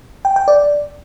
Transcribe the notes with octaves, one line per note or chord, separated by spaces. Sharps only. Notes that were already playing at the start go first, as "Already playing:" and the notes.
G5
G5
D5